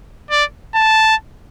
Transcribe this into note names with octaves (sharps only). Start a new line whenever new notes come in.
D5
A5